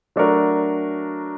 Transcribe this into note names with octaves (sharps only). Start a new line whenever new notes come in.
F#3 A3 D4 F#4 A#4